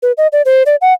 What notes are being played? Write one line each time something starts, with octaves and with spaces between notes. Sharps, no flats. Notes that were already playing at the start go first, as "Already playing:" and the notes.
B4
D#5
D5
C5
D5
F#5